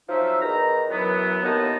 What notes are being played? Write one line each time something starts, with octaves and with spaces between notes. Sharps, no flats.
F3 F#3 D#4 E5
E2 D#3 A#5
F#2 E3 F#3 B3
D#2 A2 B3 D#4 A5